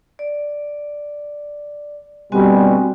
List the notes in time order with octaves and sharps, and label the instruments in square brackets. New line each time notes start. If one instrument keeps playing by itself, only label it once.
[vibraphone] D5
[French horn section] D2 B2 G3 [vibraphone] C4 F#4 G#5